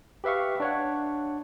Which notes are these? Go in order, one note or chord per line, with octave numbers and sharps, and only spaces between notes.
G4 B4 E5 F5 C#6
D4 C#5 F#5